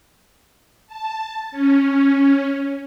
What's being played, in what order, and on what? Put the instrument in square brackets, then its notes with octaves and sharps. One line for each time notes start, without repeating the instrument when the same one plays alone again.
[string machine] A5
C#4